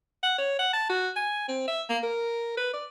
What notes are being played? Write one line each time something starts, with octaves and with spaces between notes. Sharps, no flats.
F#5
C#5
F#5
A5
F#4
G#5
C4
E5
A#3
A#4
B4
D5